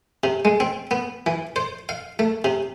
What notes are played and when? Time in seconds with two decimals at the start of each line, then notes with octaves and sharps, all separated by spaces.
0.24 C3
0.45 G#3
0.60 C4
0.91 B3
1.26 E3
1.56 C5
1.89 F5
2.19 A3
2.44 C3